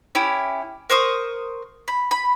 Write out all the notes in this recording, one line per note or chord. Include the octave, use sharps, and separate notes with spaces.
C#4 E4 G4
A#4 C5 C#6 D#6
B5
B5